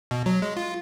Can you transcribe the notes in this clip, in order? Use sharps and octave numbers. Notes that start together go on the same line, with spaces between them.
B2
F#3
G#3
F4